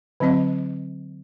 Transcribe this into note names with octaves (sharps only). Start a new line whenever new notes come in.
D3 F#3 C4 D#5